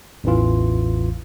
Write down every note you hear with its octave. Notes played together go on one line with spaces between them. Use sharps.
A1 E2 E3 F4